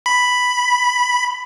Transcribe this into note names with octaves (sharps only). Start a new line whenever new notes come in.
B5